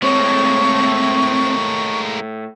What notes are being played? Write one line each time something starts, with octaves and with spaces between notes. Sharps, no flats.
A2 G#3 A#3 C4 C#5 C#6